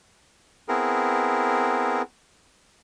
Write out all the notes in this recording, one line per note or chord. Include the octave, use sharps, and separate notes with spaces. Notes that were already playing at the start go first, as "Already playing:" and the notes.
B3 C4 E4 G#4 A#4